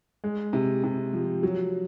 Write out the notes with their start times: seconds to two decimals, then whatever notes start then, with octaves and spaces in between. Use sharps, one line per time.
0.24 G#3
0.53 C3
0.84 C3
1.13 F3
1.43 F#3